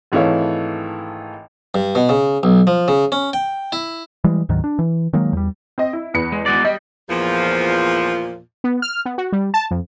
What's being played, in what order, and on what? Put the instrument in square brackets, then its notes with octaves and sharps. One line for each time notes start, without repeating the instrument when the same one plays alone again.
[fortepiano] G#1 E3 A3 C#5 F5
[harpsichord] G2
B2
C#3
B1
F3
C#3
C#4
G5
E4
[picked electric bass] E3 G3 G#3
D2 G#2 D#3 F#3
D4
E3
D#3 F#3 G#3 A#3
E2 G3
[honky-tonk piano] C4 D#5
E4
E2 B4 C#7
[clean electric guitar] G#3
G#3 F#4 D5
[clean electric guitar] G3 [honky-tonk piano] D#5
[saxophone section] E2 A#2 F3
[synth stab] B3
F6
B3
F#4
G3
A5
F2